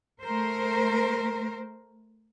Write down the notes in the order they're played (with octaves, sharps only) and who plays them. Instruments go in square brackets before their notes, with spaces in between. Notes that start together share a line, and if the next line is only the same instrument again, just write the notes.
[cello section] A3 A#4 C5